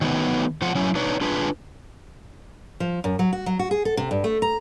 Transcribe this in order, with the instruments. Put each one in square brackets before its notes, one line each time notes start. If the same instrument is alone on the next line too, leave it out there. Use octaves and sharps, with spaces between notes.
[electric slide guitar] D#3 F#3 A3 B3
F3 F4 F#5
F#3 C#4 E4
D4 D#4 B4 C#5
D4 F4 G#4 B4
[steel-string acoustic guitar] F3
F#2
F#3
F#4
F#3
F#4
G#4
A4
C3
G2
A3
A#5